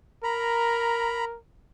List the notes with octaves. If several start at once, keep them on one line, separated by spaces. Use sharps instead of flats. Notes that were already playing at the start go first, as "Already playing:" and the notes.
A#4 A#5 B5